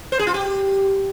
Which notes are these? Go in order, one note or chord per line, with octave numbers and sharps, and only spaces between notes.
C5
G#4
F4
G4